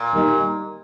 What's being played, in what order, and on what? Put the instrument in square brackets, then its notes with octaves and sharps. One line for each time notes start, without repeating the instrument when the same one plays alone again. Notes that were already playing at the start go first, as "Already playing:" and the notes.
Already playing: [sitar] A#2
[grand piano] D#3 G3 A#3 D#4